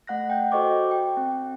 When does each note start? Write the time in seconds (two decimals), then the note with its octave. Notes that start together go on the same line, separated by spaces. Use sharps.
0.07 A3 F#5 F#6 A#6
0.30 G5 G6
0.52 F#4 A4 C5 D#5 C#6 D6
0.91 G5
1.17 C4